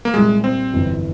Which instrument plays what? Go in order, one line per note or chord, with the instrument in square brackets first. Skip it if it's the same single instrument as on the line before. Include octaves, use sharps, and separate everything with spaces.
[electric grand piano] A#3
[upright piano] C2 A#2 G3 [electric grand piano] G#3
[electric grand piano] C4
[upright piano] G1 F2 E3